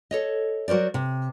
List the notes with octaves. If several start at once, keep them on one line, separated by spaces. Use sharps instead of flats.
A4 C#5 D#5
F#3 F#4 A#4 C5 D5
C3